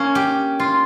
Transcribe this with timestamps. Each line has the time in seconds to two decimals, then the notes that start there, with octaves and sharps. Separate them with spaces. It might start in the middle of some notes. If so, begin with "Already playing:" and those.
Already playing: A#3 C#4
0.15 G4
0.59 F4